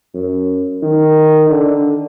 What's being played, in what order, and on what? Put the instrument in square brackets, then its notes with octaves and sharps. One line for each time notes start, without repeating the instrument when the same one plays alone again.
[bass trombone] F#2
D#3
D3